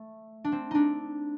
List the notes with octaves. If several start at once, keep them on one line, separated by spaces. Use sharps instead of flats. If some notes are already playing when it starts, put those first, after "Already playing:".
Already playing: A3
D4
C4
D4 D#4